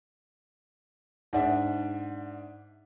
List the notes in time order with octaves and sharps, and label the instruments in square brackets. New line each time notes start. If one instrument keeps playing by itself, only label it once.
[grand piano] G#2 D4 E5 [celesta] D#4 F#5